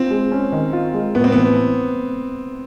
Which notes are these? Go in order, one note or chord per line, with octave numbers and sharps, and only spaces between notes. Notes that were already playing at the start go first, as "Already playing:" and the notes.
Already playing: C4 F4
G#3
C#4
D#3
F4
G#3
A2 B3
C4
E3 B3